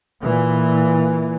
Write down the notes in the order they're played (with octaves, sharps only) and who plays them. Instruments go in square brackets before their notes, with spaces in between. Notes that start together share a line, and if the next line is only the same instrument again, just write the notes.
[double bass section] A#2 E3